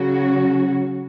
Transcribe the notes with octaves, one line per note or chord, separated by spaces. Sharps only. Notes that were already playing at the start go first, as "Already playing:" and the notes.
Already playing: C#3 F#3 C#4 F#4